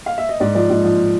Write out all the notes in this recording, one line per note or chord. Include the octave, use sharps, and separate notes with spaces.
F5
E5
D#5
G#2 D5
F3 D5
G#2
F3